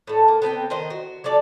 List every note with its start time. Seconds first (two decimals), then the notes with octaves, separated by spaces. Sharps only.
0.07 A2 A4
0.28 A#3
0.42 B3 C4 B4 G5
0.70 D#3 C5 D#5
0.90 F#4
1.24 F#3 A4 D5 F5